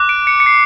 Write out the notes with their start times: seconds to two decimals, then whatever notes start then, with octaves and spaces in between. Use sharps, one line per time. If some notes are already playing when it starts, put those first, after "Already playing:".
Already playing: D6 F#6
0.09 D7
0.27 C#7
0.40 C#7
0.46 C7